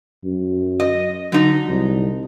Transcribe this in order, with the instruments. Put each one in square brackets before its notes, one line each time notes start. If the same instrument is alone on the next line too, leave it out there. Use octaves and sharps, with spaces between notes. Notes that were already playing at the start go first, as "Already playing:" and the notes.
[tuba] F#2
[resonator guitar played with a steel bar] D#5
[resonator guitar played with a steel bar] D3 D#4 [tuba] F#3
[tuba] C2